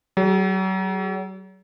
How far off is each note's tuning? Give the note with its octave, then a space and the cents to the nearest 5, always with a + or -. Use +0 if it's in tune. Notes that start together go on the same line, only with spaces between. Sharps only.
F#3 +40 G#4 +0